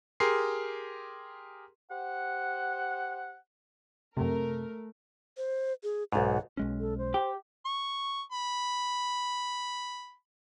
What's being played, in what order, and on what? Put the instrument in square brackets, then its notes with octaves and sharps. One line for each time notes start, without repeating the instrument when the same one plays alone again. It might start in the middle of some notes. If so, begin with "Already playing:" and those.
[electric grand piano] G4 G#4 A#4 C6 C7
[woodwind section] G4 C5 F#5
[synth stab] F#2 C3 [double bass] A3 [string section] A#4
[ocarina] C5
G#4
[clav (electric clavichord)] B1 G#2 [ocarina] F#5
[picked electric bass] B1 G#3 C#4
[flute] A4
C5
[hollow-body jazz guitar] G4
[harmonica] C#6
B5